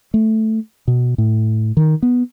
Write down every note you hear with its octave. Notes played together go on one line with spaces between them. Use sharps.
A3
B2
A2
D#3
B3